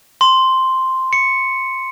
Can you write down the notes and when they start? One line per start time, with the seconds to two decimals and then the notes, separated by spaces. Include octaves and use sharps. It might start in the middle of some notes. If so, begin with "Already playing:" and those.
0.21 C6
1.13 C#7